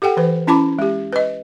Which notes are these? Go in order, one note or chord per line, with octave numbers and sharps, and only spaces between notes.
G4 A4 F#5 G5
E3 B4
C#4 E4 A5 B5 D6
G#3 G4
B4 D#5